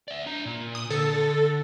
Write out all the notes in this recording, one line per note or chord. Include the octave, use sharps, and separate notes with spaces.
D5 E5
D4 A#5
A#2
D#6
D3 A4